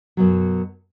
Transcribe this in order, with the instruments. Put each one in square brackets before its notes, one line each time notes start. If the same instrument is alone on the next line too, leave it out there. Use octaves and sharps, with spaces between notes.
[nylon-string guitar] F#2 B2 F#3